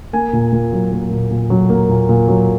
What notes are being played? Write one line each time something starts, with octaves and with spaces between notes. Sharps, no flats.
A#3 G#5
A#2
A#2
F#3
A#3
A#2
A#2
F#3
A#3
A#2
A#2
F#3